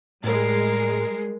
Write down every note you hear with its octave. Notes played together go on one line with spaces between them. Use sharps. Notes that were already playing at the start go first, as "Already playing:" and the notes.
A2 G3 G#3 A#4 C7